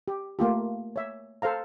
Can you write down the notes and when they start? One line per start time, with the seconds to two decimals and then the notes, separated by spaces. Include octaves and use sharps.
0.08 G4
0.39 A3 A#3 F4 G4
0.96 C#5 E5
1.42 A4 C5 F5 A#5